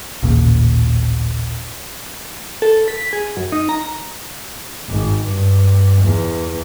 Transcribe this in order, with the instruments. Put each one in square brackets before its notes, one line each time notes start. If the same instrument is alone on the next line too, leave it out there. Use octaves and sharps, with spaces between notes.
[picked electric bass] A1 D#2 A#2 C#3
[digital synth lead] A4
B6
G#4
F#2
D#4
A#5
[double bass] G#1
G2
E2